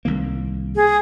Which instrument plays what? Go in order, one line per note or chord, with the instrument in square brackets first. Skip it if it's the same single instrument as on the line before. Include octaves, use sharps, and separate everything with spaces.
[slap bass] C2 D#3 A#3
[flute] G#4